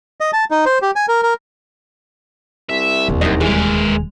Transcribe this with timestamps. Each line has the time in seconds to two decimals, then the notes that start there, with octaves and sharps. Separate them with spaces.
0.20 D#5
0.33 A5
0.51 D#4
0.66 C5
0.82 G4
0.96 G#5
1.09 A#4
1.23 A#4
2.69 C2 E5
3.08 E1 D#2
3.21 F#2 D#3 D#5
3.41 E3 G#3 A#4